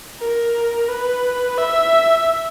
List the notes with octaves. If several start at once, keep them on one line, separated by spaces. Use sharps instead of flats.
A#4
B4
E5